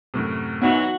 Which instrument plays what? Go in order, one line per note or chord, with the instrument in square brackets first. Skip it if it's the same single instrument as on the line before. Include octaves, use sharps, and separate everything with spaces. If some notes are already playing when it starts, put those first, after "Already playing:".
[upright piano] F#2 A2 C3
[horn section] E3 F#3 [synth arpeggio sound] B3 D#4 [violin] F#4